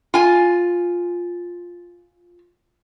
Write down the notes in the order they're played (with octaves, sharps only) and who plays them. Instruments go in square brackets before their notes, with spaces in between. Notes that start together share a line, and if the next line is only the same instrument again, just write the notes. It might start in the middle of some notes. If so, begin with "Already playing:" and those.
[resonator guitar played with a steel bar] F4 G#5